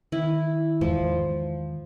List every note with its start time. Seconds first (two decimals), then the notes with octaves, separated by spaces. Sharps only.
0.12 D#3 E4
0.81 E2 G#2 F3